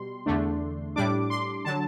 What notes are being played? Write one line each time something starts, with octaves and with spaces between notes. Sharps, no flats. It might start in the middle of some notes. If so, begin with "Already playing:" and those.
Already playing: B2 G3 C6
E2 D3 A3 D4
A2 G3 D4 D6
C6
D3 F#3 A5